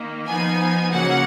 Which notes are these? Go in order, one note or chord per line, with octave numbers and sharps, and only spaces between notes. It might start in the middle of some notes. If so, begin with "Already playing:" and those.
Already playing: D#3 A#3
F3 B3 D#4 G#5
C#3 F#3 A#3 F#5